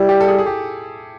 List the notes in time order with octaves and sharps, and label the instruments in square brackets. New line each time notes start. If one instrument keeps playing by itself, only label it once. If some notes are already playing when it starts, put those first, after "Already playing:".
Already playing: [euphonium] G3 [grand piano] E4
[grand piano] G4
A4
G#4
G#4
G4